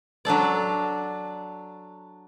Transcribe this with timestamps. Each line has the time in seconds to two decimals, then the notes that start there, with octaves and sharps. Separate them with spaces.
0.25 F#3 D4 A4 D5